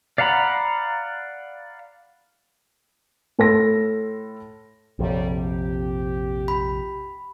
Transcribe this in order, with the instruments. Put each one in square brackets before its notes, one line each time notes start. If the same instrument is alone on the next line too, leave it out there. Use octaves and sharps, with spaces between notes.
[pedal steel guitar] D5 F5 F#5 A#5 B5
[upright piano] A2 A4 C6 A#6
[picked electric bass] A#1 F2 C3 [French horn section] G3 A4 C#5
[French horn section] G4
[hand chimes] B5